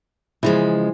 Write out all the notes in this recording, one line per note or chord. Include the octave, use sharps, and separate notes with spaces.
C#3 E3 F3 G#3